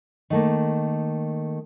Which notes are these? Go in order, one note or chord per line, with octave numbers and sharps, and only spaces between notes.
D#3 A3 A#3